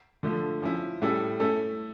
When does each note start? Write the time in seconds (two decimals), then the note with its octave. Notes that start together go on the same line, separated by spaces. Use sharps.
0.23 D3 F3 A3
0.62 F3 C#4 E4
1.02 A2 G3 C#4 E4 A4
1.40 A3 C#4 E4 A4